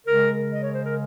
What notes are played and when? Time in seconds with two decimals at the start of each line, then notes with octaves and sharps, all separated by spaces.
0.06 C#3 G#3 A#4
0.53 D#5
0.63 C#5
0.73 C5
0.83 A#4